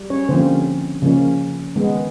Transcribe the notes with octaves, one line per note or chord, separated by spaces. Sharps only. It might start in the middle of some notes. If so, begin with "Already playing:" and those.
Already playing: G3
C#4 C#5
D3 F3 A#3 C4 C#4 C5
C#3 F3 A#3 C#4
D#3 G#3 B3